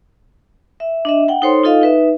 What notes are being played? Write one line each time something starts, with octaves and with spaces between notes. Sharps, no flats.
E5
D4 D#5 E5
F#5 G5
D#4 A4 C5 C#5 C6
D#4 F4 A4 D#5 F5
D#4 B4 E5